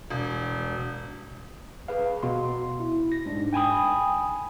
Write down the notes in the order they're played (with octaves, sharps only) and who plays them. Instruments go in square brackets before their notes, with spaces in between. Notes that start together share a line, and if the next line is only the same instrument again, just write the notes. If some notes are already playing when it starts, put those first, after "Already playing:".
[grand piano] E1
[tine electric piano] G#4 B4 F5
B2 C6
E4
A#6
G#2 D4
G5 G#5 B5 D#6